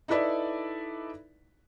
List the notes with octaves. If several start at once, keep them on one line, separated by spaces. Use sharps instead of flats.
D#4 E4 A4 B4 D5 E5